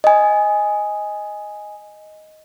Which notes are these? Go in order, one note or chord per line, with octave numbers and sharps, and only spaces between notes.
D#5 G#5